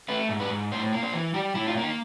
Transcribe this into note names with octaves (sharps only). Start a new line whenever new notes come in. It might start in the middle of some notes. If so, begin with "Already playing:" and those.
A3 B4
G#2
B4
G#2
A2 C5
A#3
C5
E3
G3 G4
A2 E4
F4
A#3
D#4